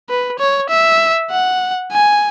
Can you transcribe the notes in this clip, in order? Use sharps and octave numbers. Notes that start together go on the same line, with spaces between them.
B4
C#5
E5
F#5
G#5